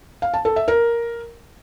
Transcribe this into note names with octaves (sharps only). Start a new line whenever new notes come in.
F5
A5
A4
E5
A#4